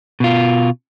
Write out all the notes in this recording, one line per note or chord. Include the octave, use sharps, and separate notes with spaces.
B2 F4